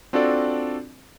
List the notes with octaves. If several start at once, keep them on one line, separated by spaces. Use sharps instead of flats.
C4 D4 F4 F#4 A4 D5